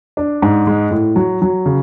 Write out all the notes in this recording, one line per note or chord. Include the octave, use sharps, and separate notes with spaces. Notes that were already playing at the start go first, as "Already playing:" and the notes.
D4
G#2
G#3
A2
F#3
F#3
C#3